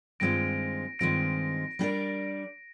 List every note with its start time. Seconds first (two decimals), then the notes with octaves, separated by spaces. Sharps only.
0.20 G2 D#3 G#3 C4 F4 A#6 D7
0.99 G2 D#3 G#3 C4 F4 A#6 D7
1.79 G3 D4 G4 A#4 D5